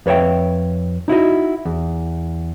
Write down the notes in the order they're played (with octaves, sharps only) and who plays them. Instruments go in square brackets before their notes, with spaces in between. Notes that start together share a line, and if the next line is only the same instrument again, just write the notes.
[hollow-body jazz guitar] F2 B4 C#5 E5 G5
D#4 E4 F#4 D#5
E2